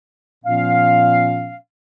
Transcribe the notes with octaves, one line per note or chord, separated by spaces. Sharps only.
A#2 F3 B3 C#4 F5